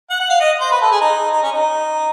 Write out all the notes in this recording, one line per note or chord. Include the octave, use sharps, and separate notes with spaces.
F#5
F#5
F5
D#5
C5
B4
A4
G#4
D#4
D#4
C#4
D#4